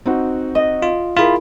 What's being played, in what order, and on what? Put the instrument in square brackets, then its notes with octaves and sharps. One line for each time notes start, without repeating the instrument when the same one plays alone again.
[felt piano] C4 D#4 F#4
[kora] D#5
[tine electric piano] F4
[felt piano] E4 G#4 A#4 [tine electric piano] F4 B5